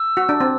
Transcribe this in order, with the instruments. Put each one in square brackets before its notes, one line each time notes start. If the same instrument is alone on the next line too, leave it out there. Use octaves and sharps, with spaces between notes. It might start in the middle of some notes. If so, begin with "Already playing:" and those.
Already playing: [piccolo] E6
[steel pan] F#4
D4
C4